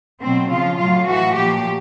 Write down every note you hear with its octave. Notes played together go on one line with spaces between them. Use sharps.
B2 F#3 C4
C#3 F3 F4
A2 F#3 F4
A2 E3 F#4
A#2 F3 G4